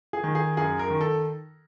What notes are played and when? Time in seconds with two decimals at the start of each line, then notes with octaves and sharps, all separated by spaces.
0.13 G#4
0.24 D#3
0.35 G#4
0.57 F#2 G#4
0.79 A#4
0.90 D#3
1.01 A4